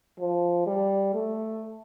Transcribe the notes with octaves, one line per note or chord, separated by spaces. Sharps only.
F3
G3
A3